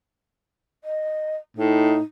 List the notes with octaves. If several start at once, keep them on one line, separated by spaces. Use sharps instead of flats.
D#5
A2 D#4